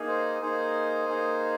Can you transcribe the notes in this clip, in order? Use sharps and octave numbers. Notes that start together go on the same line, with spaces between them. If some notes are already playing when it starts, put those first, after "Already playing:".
Already playing: A#3 D#4 G#4
C5
A#3 D#4 G#4 C5
A#3 D#4 G#4